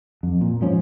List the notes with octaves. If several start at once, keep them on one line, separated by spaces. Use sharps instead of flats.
F2
A#2
G#2 F3 C#4